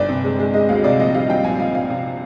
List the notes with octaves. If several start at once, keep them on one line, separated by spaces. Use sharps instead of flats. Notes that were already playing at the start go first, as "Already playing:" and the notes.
Already playing: G1 D5
C3
G#3
G#3
G#3 D#5
D2 F5
C3 D5
A#1 D#5
G3 F5
G3 G5
A#1 G#5
A#1 F5
A#1 F5
C3